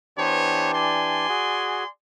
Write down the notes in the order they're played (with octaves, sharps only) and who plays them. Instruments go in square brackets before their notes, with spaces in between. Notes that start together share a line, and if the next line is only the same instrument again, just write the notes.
[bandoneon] E3 D4 G4 [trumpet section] B3 C5 C#5
[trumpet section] D5 G#5 C6
[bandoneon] F#4 G#4